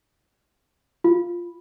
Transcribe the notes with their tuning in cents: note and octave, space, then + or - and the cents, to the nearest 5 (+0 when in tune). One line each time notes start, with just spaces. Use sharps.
F4 +0